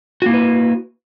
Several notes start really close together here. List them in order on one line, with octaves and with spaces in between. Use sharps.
F#4 A#3 E4 B4